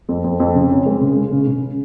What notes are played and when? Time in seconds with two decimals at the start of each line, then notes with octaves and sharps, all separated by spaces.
0.09 F2
0.24 F2
0.40 F2
0.55 C#3
0.70 C#4
0.86 G#3
1.01 C#3
1.16 G#3
1.32 C#3
1.47 C#3